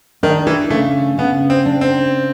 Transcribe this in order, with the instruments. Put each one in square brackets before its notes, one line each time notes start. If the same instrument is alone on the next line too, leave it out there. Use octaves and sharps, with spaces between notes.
[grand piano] D#3 [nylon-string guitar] D4
[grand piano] E3
[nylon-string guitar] C#3 [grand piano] A3
[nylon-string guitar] C#3 [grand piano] B3
[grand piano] C4
[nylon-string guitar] D4
[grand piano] C4